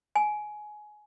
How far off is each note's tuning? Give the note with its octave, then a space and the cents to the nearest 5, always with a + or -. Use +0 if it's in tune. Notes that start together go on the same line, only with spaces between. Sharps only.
G#5 +20